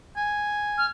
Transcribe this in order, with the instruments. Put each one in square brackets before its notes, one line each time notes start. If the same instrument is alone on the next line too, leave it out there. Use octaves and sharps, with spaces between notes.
[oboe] G#5
[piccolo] F6